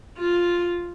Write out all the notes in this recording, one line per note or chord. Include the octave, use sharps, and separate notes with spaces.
F4